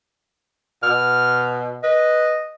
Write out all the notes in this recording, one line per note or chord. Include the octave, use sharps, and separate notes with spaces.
B2 F6
B4 D#5